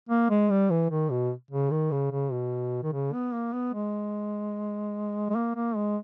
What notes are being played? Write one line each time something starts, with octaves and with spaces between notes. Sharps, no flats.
A#3
G#3
G3
E3
D#3
B2
C#3
D#3
C#3
C#3
B2
D#3
C#3
B3
A#3
B3
G#3
G#3
A#3
A#3
G#3